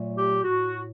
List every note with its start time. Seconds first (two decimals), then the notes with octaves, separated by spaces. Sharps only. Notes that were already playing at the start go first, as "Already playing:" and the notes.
Already playing: A#2 F#3 A3
0.18 G4
0.42 A2 F#4